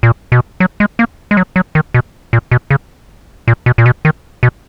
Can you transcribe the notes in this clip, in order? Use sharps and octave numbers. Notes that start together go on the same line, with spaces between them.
A#2
B2
F#3
G#3
A#3
G#3
F#3
F#3
D#3
B2
A#2
B2
C#3
A#2
B2
A#2
B2
D#3
B2